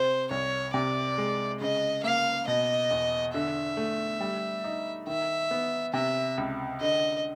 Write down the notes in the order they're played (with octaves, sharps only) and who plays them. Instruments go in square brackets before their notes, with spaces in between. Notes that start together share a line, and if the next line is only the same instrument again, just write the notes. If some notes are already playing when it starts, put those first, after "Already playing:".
Already playing: [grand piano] C3 [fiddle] C5
[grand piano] C2 [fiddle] C#5
[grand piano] C3 [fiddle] D5
[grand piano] G#3
[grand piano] C#3 [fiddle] D#5
[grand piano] A#3 [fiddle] F5
[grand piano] B2 [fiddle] D#5
[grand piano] E2
[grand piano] D3 [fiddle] E5
[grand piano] A3
G3
D#4
[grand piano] D#3 [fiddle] E5
[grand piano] B3
[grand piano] C3 [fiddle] E5
[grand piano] C#2
[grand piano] D3 [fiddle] D#5